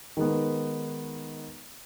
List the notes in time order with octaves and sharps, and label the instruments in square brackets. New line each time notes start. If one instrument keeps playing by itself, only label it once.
[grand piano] D#3 G#3 B3